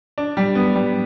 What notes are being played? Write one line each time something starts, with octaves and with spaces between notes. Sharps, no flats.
D4
G3
B3
G3